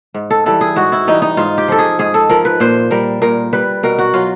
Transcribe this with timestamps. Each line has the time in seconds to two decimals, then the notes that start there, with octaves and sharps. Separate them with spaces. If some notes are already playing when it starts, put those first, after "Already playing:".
0.14 G#2
0.31 A4
0.46 E3 G3 A4
0.61 G#4
0.76 G#2 F#4
0.92 E4
1.07 E3 G3 D#4
1.22 D#4
1.37 G#2 F4
1.58 G4
1.68 F3 A4
1.79 G#4
1.99 G#2 G#4
2.14 A4
2.30 F3 A#4
2.45 B4
2.60 A#2 C5
2.91 G3 A#4
3.22 A#2 A#4
3.53 G3 B4
3.83 B2 A#4
3.99 F#4
4.14 F#3 F4